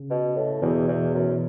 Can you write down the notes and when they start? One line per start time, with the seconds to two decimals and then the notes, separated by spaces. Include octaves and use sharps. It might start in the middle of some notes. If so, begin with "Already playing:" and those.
Already playing: C#3
0.10 B2
0.36 A2
0.62 E2 B2 E3
0.88 E2
1.14 F#2